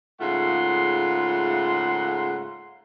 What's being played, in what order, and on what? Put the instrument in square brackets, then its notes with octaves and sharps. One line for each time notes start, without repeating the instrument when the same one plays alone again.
[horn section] G#2 C#3 A3 F4 F#5 C6